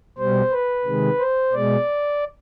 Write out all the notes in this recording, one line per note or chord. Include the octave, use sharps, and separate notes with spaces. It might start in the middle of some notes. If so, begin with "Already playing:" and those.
B2 G3 C5
B4
C3 D#3 G#3
C5
B2 G#3 D5